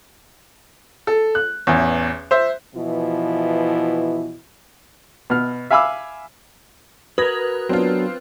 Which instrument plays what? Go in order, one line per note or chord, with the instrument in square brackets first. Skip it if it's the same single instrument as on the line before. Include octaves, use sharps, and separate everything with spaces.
[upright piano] A4
F#6
A1 E2
C5 E5
[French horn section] B2 E3 F3 E4
[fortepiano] B2 F6
E5 F5 G#5 B5 D6 E6
[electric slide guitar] F#4 A#4 [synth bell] B4 [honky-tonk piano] D#6 G#6 A#6
[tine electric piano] F#3 B3 D4 [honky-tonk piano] C4 F4